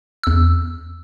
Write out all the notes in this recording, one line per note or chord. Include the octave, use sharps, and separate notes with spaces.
E2 E6